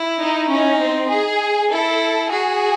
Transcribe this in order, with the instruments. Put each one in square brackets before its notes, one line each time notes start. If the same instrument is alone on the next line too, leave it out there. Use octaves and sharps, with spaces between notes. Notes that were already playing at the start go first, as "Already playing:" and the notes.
Already playing: [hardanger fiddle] E4
[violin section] D#4
[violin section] C#4 [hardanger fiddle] D#4
[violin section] C4
G#4
[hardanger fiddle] E4 [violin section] A4
[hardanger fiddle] F#4 [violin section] G#4